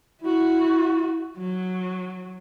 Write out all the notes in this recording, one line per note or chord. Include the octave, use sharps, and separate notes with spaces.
E4 F#4
F#3